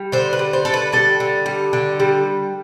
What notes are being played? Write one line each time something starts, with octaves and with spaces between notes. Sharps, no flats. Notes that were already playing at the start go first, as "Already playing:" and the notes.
Already playing: G3
D3 C5
B4
G3
C5
D3 A4
B4
G3 A4
D3
G3
D3
G3